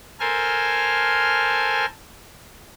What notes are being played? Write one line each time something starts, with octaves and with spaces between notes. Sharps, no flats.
A4 A#4 C5 G#5 F6